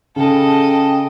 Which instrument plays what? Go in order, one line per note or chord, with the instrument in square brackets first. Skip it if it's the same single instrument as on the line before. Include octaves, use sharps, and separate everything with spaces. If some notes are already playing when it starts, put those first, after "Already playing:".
[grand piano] C#3 [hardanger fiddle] A4 D#5 [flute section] G5 A5